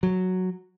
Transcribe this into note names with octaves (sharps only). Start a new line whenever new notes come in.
F#3